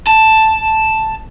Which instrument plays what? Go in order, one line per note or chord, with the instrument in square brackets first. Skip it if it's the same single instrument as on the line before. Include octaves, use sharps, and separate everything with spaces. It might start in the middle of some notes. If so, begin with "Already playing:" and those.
[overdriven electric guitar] A5